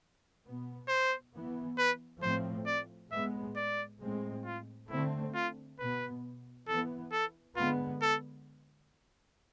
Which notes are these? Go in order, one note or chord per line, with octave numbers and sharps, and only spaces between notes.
B2 B3
C5
E3 B3
B4
A2 F3 A3 C4 C5
D5
A2 G#3 B3 E5
D5
A2 G#3 C4
F4
D3 A3 C4 E4
F4
B2 B3 B4
E3 B3 A4
A4
D3 G#3 B3 F4
A4